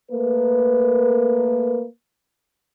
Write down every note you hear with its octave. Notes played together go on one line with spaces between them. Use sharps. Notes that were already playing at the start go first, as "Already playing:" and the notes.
A3 A#3 A#4 B4